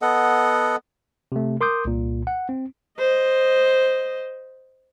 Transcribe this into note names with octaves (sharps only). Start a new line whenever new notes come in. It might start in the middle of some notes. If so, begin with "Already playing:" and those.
B3 A4 D#5 F#5
C3 A3
A#4 C6 D6 D#6 G6
C2 A#2
F#5
C4
C5 D#5